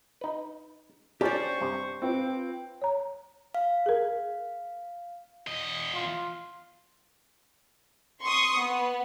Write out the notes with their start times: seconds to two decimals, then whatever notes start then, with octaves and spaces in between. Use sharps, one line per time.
0.21 D#4 B4
1.21 C#4 D4 G4 C5 D5 C#6
1.61 G2 C3
2.02 C4 F4 B4 D6
2.82 C#5 A#5
3.55 F5
3.86 G#4 A#4
5.47 E2 D#5
5.94 F4
8.21 C6 C#6 D#6
8.59 B3